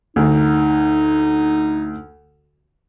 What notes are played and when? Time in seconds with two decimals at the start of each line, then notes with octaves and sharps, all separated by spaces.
0.16 D2 D#4